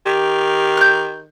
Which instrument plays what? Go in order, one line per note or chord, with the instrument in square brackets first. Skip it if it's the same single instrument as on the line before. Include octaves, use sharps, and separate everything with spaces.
[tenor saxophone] D#3 [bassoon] G4
[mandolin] F#6 G6